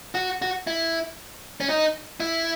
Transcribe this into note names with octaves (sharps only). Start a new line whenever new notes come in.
F#4
F#4
E4
C#4
D#4
E4